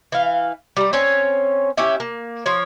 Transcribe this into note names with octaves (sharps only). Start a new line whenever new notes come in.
E3 F5
G3 A#5
C4 C#4 C#5
C#4 E4 G4 E5
A#3
F3 C#5